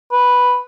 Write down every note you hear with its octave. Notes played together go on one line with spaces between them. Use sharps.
B4